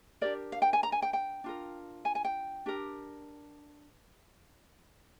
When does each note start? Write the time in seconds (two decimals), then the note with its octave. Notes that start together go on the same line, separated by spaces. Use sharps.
0.21 D4 G4 A#4 D5
0.52 F5
0.62 G5
0.73 G#5
0.83 A#5
0.92 G#5
1.02 G5
1.13 G5
1.44 D4 F4 A#4
2.05 G#5
2.15 G#5
2.25 G5
2.66 D4 G4 A#4